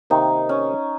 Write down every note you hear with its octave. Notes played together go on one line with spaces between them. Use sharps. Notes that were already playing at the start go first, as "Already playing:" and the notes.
C3 D#3 A#3 D#4
C#4